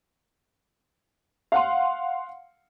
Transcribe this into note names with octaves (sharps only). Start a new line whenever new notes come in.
F5 F#5 C6